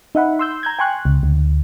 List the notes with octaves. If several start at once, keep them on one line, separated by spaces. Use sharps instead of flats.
D#4 E5 F#5 B5
C6 E6 G6
A#5 G6 G#6
G5 G#5 C6 C#6 F#6
C#2
D2